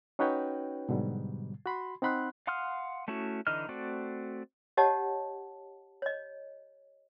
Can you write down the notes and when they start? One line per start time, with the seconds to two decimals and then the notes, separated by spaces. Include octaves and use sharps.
0.19 C#4 D#4 F#4 B4 C#5 G5
0.89 G#2 B2 D3 F#3 G3
1.66 F#4 B5 C6
2.02 C4 D#4 F#5 B5 C6 F#6
2.47 F5 F#5 C6 D#6 F6
3.08 A3 C#4 E4 F#4
3.47 D3 E3 D#4 D#5 F6
3.69 A3 C4 F#4 D5
4.77 G4 C#5 D#5 F#5 A5
6.02 C#5 D#5